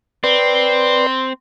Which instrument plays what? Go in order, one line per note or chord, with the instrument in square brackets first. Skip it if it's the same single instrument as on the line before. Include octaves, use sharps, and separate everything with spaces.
[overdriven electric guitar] C4 [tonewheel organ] B4 D5 C6